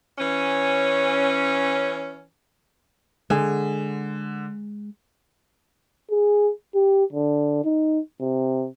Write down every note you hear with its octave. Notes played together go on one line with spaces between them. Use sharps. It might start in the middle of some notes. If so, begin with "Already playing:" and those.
E3 C#4
D3 G#3 G#4
G#4
G4
D3
D#4
C3